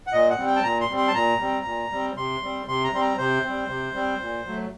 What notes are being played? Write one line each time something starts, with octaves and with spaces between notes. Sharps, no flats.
F#5
A#2 D#5
F#5
G3 C4
G5
A5
A#2 A#5
C6
G3 C4
C6
A5
A#2 A#5
G3 C4
A#2
G3 C4
C3 C6
G3 C4
C3 C6
A#5
G3 C4 C6
A#5
C3 C5
G3 C4
C3
G3 C4
A#2
F#3 A3